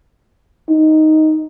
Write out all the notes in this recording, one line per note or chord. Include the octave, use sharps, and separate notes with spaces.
D#4